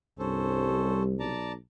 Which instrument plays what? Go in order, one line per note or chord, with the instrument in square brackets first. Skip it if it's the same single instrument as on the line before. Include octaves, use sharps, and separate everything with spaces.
[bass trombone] C2 [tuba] G2 [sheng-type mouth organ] C#4 A4 C5
[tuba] G3
[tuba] B1 [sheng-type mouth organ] D5 A5 A#5